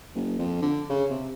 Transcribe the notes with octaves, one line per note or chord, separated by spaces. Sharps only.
F#1
F2
D3
C#3
C3